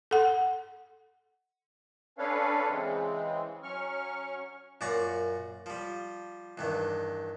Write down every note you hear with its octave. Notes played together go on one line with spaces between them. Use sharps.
A4 F#5
C#4 D4 A4 B4 C#5 F5
C#3 E3 G#3 C4
F#3 C#4 C#6 F6
F#2 A#2 D5 A#5 C#6
F3 G3
E2 G2 D#3